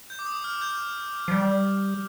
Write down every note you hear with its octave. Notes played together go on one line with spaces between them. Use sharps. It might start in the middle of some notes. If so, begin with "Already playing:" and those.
G6
D6
D#6
F6
G6
F3
G3